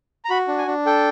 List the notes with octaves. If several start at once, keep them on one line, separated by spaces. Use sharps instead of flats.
A#5
F#4 B5
D4
G#5
D4
A4 G5